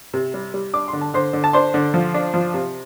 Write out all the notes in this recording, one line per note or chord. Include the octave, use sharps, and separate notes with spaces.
C3
G3
G3
D4 D6
C6
D3
A5
D3 C5 C6
D3
A5
D4 C5 C6
D3
F3
D4
F3
C3